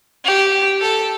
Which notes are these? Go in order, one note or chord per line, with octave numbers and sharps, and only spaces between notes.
G4
A4